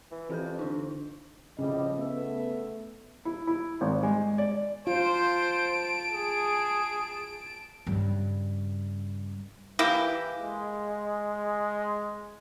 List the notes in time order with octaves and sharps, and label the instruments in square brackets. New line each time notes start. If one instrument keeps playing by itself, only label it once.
[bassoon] E3
[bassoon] F2 [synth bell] E3 G4 G6
[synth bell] D3 D4 D#4
[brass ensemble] A2 F3 G3 [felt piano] C#3 [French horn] D#5
[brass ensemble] A3 E5 [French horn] B3
[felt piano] E4
E4
G#1
G#3
D5
[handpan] F4 [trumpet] C5 [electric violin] A5 D7
[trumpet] G#4
[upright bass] G2 C#3
[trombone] E3 [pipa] A#3 E4 G4
[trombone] G#3